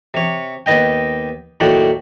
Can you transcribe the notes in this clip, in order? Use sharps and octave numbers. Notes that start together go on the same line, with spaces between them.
C3 C#5
D#2 B3 D#5 G5
D#2 A2 F#3 D5 F#5 G5